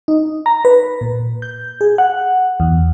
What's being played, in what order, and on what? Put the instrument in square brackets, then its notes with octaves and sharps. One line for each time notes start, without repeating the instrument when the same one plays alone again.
[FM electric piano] D#4
A#5
B4
A#2
G6
G#4
F#5
E2